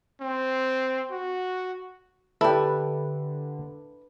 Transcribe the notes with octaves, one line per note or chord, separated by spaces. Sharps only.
C4
F#4
D3 E4 G4 A4 B4 D5